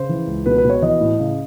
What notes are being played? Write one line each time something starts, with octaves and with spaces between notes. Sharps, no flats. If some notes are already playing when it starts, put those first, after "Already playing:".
Already playing: C#3 C5
E3
C#2
B2 B4
B4
B2
C#5
E3 D#5
A2
C#3